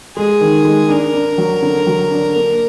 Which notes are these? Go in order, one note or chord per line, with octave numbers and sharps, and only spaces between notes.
G#3 G#4
D#3
G#3
D4 A#4
D4
F#3
D3
F#3
D4
A#3